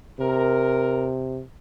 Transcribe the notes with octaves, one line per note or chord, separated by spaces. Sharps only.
C3 A#4